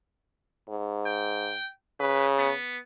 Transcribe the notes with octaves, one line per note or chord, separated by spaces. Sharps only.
G#2
G5
C#3 B4
B3